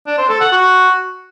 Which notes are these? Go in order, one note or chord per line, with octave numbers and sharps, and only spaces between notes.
D4
C5
A4
F#5
F#4